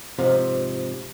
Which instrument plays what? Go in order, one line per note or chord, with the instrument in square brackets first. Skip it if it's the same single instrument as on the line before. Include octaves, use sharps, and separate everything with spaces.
[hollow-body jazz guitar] G#2 C3 F3